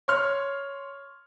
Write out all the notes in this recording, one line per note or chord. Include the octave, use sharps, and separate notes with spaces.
C#5 C6 F6